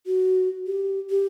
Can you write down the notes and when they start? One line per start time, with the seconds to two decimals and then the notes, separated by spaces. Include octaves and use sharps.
0.06 F#4
0.67 G4
1.10 G4